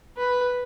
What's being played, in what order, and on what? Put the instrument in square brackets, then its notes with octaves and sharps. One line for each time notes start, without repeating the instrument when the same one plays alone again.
[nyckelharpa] B4